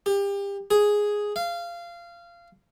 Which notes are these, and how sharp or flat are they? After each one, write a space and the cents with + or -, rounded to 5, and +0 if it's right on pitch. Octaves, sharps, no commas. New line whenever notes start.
G4 +30
G#4 +0
F5 -20